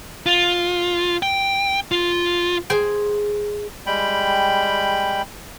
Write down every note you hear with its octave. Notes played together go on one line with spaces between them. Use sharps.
F4
G5
F4
G#4 C5 G5
G3 G#3 G5 B5